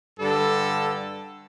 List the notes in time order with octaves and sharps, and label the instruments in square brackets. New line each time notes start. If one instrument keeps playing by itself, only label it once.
[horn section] G2 D3 G3 A4